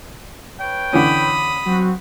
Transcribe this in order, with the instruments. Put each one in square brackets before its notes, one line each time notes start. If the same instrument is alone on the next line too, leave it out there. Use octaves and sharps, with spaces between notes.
[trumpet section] B4 C#5 G5
[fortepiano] D3 E3 C#4 [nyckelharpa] B5 D#6
[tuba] F#3 [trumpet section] C4 F#4